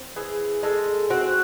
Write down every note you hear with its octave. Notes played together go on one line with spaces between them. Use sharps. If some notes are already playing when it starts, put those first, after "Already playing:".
Already playing: C4
E3 G#4
G#3 A4
C4 F#4